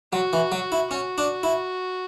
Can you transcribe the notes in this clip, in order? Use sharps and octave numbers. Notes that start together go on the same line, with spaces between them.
F#3 F#4
E3
F#3
E4
C#4 F#4
D4
E4